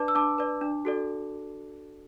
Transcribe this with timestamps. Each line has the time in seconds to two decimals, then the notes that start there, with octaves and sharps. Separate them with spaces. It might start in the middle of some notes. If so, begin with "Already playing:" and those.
Already playing: D4 B4 D5 A5 D6
0.08 E6
0.15 D4 A5 D6
0.38 B4 D5
0.61 D4
0.85 F#4 A4 D5